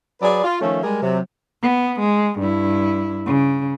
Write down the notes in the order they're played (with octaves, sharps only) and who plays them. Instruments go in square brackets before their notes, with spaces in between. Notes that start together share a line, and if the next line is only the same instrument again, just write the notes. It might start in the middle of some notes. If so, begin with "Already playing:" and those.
[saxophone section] F#3 G#4 B4 D5
F4
D#3 F3 A3 C#4 A4 E5
G3 G#3 G#4 A#4
C3 F#3
[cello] B3
G#3
G2 E4
C#3